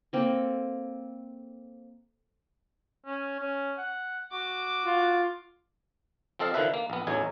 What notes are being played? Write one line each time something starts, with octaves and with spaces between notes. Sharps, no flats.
A#3 C4 A4
C#4
C#4
F#5
F#4 D6
F4
F3 C4 A4 D#5 F5
D3 D#3 F3 E4 B4 E5
A#3
A#1 B3
A1 E2 A2 F#3 D#4 G#5